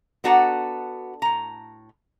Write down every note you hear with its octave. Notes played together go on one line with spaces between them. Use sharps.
B3 D4 F#4 A4 F#5 A#5
A2 A#5